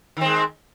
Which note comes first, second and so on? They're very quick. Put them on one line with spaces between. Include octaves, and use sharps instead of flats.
D#3 C4 G#3